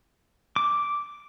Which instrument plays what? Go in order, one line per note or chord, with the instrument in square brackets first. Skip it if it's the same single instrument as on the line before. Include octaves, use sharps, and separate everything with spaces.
[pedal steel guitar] D6